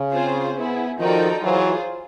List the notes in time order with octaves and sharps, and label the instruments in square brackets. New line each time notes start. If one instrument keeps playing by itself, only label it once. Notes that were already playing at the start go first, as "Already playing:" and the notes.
Already playing: [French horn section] C#3
[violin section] C4 F4 G#4 C5
B3 E4 G#4
[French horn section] D#3 F3 [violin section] D#4 F#4 A4 D5 G5
[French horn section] E3 F#3 [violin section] F4 G#4 C5